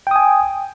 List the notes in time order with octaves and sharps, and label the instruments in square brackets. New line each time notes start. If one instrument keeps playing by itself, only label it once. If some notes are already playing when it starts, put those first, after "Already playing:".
[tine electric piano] G5
D#6
G#5